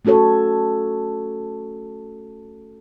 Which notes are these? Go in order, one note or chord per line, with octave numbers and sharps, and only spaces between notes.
A3 C#4 F#4 A4 C#5